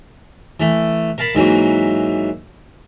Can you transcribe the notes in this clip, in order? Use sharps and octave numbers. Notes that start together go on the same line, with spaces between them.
E3 A3
A#4 F5 A5 B5
G#2 E3 F#3 A#3